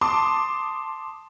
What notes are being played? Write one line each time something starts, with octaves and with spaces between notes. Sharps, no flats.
A5 C6 D6 D#6